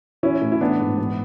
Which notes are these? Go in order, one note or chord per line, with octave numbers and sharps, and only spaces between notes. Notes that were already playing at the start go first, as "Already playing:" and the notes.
E3 C#4 E4
A2
E4
E3 B3 D4
G#2
E3 B3